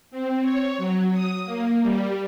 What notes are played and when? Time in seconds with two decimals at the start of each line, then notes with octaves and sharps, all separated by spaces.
0.11 C4
0.41 C#5
0.78 F#3
1.13 D#6
1.45 A#3
1.82 G3